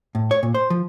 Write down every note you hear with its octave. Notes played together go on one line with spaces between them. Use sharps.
A2
C#5
A#2
C5
F3